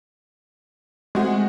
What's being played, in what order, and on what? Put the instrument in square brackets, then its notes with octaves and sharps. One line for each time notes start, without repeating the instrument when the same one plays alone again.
[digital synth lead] G#3 [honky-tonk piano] A3 C4 F#4